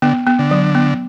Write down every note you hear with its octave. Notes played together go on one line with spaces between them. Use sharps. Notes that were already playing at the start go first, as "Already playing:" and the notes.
D3 B3
B3
D3
F#3
B3